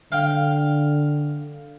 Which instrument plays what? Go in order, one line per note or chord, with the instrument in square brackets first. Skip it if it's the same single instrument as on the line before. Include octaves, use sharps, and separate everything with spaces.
[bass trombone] D3 [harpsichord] F5 G5